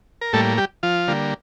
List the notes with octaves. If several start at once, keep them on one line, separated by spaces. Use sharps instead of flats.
A#4
A2 G3 A3 A#3 A4
G3 G4
F3 F4
D3 G3 A#3